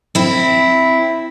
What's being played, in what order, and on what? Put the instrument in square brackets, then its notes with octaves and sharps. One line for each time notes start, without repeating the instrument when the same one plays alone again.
[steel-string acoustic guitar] C4 E4